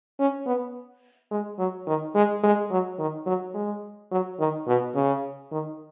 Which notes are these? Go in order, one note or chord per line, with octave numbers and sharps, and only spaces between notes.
C#4
B3
G#3
F#3
D#3
G#3
G#3
F#3
D#3
F#3
G#3
F#3
D#3
B2
C#3
D#3